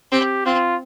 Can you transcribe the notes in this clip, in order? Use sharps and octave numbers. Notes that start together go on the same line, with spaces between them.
C4 G4
C4 F4